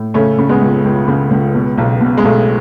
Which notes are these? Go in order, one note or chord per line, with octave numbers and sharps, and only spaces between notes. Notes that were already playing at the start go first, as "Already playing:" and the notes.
Already playing: A2
C#3 A3 C#4
C#3
G#3 B3
C#2
C#2
C#3
C#2
B2
B1
B2
G#3
B1 A3